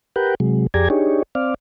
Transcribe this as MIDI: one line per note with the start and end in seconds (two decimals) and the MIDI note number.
0.16 0.35 67
0.16 0.35 70
0.16 0.35 71
0.16 0.35 78
0.16 0.35 79
0.40 0.67 48
0.40 0.67 54
0.40 0.67 56
0.74 0.89 41
0.74 0.89 67
0.74 0.89 68
0.74 0.89 74
0.74 0.89 82
0.74 0.89 92
0.90 1.23 62
0.90 1.23 63
0.90 1.23 67
0.90 1.23 68
0.90 1.23 73
1.35 1.54 60
1.35 1.54 74
1.35 1.54 77